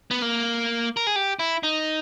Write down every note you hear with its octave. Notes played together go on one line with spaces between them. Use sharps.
B3
A#3
A#4
G#4
G4
E4
D#4